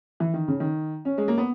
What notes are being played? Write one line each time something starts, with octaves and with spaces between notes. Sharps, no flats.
E3
D#3
C#3
D#3
C#4
G#3
A#3
B3